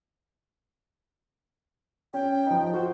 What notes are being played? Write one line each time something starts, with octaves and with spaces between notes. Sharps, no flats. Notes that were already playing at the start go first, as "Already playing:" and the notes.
C#4 G5
F3 D#4
F#4 C5